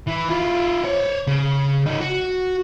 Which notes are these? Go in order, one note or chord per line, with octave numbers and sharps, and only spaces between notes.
E3
E4 F4
C#5 D5
C#3
C#3 D#4
F#4